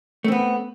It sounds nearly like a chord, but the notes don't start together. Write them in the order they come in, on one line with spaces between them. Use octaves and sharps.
A3 C4 B3